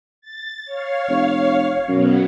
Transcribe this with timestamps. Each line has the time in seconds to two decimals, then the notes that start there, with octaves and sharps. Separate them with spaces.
0.21 A6
0.65 C#5 F5
1.09 F1
1.88 F#2 B2 F#3 B3